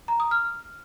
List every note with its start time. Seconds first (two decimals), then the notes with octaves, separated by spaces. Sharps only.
0.08 A#5
0.20 D#6
0.31 F6